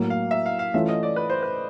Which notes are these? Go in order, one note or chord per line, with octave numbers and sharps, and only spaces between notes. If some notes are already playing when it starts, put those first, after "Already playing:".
Already playing: A2 F#3 A#3
F5
E5
F5
F5
E3 A3 C#4 F4 E5
D#5
D5
B4
C5
B4